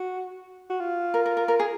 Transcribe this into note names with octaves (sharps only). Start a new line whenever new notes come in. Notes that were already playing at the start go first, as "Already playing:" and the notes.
Already playing: F#4
F#4
F4
A#4
A#4
A#4
A#4
G#4